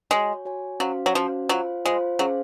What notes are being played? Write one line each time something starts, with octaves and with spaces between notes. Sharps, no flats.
G#3 F#4 C#5 G#5
F#4 C#5 G#5
F#3 C#4 F#4 C5 F5
F#3
F3 C#4 F#4 C5 F5
F#3 F4 C5 F5
G#3 F4 C5 F5
F#3 C#4 G#4 C5 F5